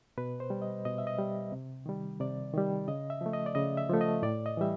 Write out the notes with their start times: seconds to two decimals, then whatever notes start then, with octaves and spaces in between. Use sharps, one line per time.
0.18 B2 B4
0.40 C5
0.50 G3
0.62 D#5
0.85 B2 D#5
0.98 E5
1.07 D#5
1.18 G3
1.52 C3
1.86 D#3 G3
2.20 C3 D5
2.53 D#3 G3
2.88 C#3 D#5
3.10 E5
3.21 F3 A3
3.33 D#5
3.46 D5
3.55 C#3 D#5
3.77 E5
3.90 F3 A3
4.01 D#5
4.23 A2 D5
4.46 D#5
4.57 E3 G3 E5